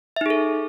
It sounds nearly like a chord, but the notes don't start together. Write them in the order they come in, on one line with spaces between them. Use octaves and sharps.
E5 D#4 G#4 A4